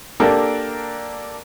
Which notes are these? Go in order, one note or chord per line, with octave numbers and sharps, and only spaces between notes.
A#3 D4 G4 A4 A#4